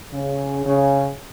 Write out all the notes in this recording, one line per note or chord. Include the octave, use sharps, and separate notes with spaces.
C#3
C#3